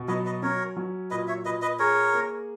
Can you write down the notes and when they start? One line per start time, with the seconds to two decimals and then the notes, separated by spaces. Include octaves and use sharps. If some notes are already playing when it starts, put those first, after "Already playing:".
Already playing: B2
0.08 F#3 B4 D#5
0.25 B4 D#5
0.42 C#4 A#4 C#5
0.77 F#3
1.11 A#2 B4 D#5
1.28 C#5 E5
1.45 A#2 B4 D#5
1.62 B4 D#5
1.79 G#4 A#4 C#5
2.13 A#3